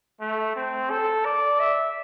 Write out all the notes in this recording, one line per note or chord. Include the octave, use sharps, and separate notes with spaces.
A3
C4
A4
D5
E5